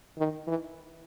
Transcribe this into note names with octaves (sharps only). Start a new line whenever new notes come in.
D#3
E3